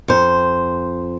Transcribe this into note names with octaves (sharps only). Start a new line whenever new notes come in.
F2 C5